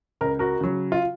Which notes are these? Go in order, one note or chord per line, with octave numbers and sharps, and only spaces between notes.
C#2 A#4
F#4 A#4
C#3 F#3
F4